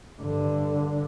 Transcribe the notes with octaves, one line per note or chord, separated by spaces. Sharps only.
G2 D3